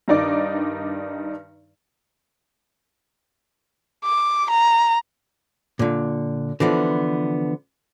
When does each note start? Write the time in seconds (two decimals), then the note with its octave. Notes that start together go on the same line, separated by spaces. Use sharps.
0.08 G2 D#3 D#4 D5 D6
4.04 D6
4.50 A#5
5.79 A#2 D3
6.60 D3 E3 F3 B3